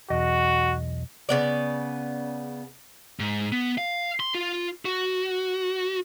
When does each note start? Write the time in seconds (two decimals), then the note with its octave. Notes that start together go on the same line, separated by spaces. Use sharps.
0.10 B1 E2 F#4 D#5
1.29 C#3 B3 D5
3.20 G#2
3.52 B3
3.78 F5
4.20 C6
4.35 F4
4.85 F#4